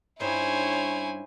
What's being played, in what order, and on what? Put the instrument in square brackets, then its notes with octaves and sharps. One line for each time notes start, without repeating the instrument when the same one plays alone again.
[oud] G2 C#4 D#4 [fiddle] E4 G#5 [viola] C5 C#5